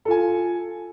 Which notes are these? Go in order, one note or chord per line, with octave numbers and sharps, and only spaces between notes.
F4 A4 G#5